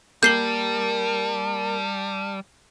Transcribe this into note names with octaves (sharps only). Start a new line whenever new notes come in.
G3 A#3 A5 G6 C7 E7 F#7 G7